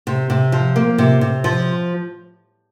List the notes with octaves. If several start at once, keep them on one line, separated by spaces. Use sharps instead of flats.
C3
C3
F3
A#3
C3
C3
F3